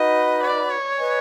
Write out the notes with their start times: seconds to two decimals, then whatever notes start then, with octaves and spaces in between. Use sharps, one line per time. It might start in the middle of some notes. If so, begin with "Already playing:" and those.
Already playing: D#4 F#4 B4 D#5
0.43 D5
0.70 C#5
0.98 B4 D#5 G#5